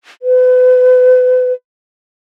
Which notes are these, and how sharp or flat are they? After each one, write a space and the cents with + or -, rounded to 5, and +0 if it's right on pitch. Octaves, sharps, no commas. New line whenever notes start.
B4 +35